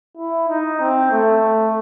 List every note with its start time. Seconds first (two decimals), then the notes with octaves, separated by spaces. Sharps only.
0.17 E4
0.49 D#4
0.80 C4
1.11 A3